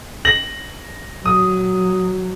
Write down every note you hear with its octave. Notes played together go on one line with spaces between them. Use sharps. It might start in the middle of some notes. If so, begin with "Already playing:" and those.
A#6 F#7
F#3 D#6